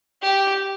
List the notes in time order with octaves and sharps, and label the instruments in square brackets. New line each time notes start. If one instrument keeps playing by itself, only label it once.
[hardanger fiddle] G4